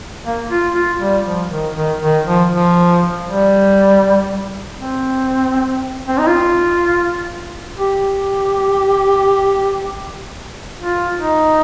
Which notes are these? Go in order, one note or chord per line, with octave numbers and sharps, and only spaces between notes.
A#3
F4
F4
G3
F3
D#3
D#3
D#3
F3
F3
G3
C4
C4
D#4
F4
G4
F4
D#4